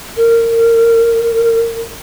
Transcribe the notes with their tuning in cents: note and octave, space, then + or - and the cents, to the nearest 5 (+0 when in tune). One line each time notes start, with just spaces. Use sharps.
A#4 -20